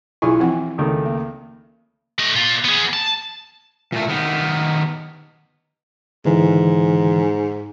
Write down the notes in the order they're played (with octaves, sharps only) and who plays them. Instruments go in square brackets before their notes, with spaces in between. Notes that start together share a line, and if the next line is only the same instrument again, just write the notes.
[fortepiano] B1 G#5 C#6 [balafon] E4 F4 G#4
[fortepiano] E3 [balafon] F3 C4 F#5
[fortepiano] C#2 D#3 A3
[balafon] A#3
[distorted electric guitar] A3 D#5
A#2 F4
B3 G#4
A5
[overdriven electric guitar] A#2 A3
D#3 B3
[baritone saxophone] G#2 [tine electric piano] D3 E3